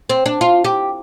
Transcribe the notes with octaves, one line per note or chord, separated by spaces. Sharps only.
C4
D4
F4
G4